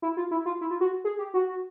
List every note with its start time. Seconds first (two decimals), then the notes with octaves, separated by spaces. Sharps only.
0.02 E4
0.17 F4
0.31 E4
0.46 F4
0.61 E4
0.71 F4
0.81 F#4
1.04 G#4
1.19 G4
1.34 F#4